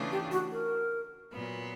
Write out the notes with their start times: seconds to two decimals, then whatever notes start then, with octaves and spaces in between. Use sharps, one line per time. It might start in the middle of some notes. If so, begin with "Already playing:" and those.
Already playing: C#3 E3 A3 D4 F4
0.11 G4
0.31 F#4
0.51 A#4
1.33 A#2 F#3 B3